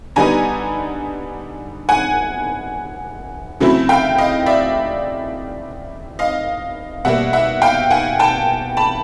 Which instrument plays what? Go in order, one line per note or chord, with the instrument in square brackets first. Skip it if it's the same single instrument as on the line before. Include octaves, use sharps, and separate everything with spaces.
[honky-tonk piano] D3 G3 B3 D#4 G#5 A#5
F#5 G#5
C#3 F#3 A3 C4 E4
F5 G5
D#5 F5
D5 E5
D#5 F5
B2 G3 A#3 E5 F#5
E5 F#5
F5 G5
F#5 G#5
G5 A5
A5 B5